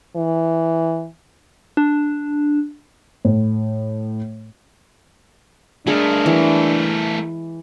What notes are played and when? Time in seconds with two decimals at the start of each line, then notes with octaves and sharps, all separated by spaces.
0.16 E3
1.77 D4
3.25 A2
5.87 G#3 A3 D4 G#4 A#4 B5
6.26 E3